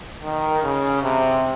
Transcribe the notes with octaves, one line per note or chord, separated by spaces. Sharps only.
D#3
C#3
C3